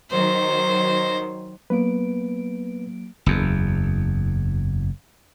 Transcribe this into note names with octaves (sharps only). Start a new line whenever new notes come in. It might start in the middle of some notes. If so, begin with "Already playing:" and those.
D#3 F#3 C5
F#3 A#3 B3 B4 D7
F#1 E2